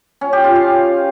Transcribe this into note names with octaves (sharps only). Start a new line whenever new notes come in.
C#4
G4
F4
F5